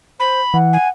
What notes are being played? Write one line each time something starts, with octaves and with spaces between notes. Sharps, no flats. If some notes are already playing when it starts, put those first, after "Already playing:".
C5 B5
E3 F#5
G#5